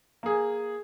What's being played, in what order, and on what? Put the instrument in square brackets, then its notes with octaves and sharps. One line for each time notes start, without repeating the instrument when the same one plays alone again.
[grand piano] A#3 G#4